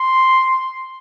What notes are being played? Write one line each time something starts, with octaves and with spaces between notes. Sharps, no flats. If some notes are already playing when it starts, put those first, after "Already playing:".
Already playing: C6